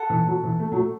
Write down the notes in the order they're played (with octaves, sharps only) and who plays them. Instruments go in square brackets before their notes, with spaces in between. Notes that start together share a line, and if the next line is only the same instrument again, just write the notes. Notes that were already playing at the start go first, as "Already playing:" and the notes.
Already playing: [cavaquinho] A4 F#5
[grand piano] E3
F#3
E3
A3
F#3
A3